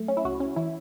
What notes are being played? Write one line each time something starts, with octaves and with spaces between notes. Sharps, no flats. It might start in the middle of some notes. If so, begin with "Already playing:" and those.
Already playing: F#2 A3
C#4
E4
C#2 F#4
C#4
E3 E4